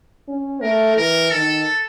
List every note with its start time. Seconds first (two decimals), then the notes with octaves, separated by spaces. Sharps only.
0.28 C#4
0.62 A3 A#4
0.96 E3 A#4
1.31 D#3 A4